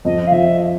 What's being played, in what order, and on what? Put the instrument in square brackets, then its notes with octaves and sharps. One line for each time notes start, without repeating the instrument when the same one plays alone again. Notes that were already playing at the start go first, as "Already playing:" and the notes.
[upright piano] F2 [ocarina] D#5
[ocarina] F5
[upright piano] F3 [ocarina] E5